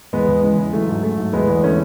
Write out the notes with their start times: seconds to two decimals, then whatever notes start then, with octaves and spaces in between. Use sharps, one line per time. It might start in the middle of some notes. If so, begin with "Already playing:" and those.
0.13 E2 G#3 B3
0.28 E2
0.43 C#3 G#3
0.58 E3
0.73 F#3 A3
0.88 G#2
1.03 F#3 A3
1.18 G#2
1.33 E2 G#3 B3
1.48 E2
1.63 D3 A3 C#4